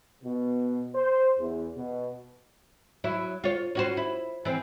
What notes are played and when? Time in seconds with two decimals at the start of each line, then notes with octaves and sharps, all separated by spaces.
0.22 B2
0.95 C5
1.39 E2
1.77 B2
3.04 F#3 E4
3.44 F4 C#5
3.75 C#4 F#4 C5
3.97 E4
4.45 E3 C4